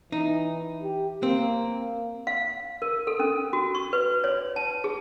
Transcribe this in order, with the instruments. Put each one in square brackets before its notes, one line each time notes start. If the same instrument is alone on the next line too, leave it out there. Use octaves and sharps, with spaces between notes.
[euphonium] E3 [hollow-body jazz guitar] D#4
[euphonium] G4
[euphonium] A#3 [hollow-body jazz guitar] C4
[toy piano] F5
A#4
A4
C#4
F#4
C#6
B4
C#5
A5
G#4